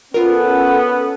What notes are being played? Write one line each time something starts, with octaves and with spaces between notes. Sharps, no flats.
B3 C#4 F4 A4 A#4